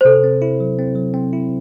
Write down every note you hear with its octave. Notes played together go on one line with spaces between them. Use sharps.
C5
C3 A4
C4
E4
F#3
C4
F#3
C4
E4